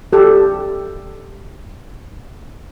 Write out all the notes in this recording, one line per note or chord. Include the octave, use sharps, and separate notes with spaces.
G4 A4